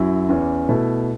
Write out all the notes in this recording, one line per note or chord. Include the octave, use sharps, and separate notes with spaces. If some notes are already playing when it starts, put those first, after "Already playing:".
Already playing: F#2 F#3 E4
E2 E3 C#4
B2 A3 E4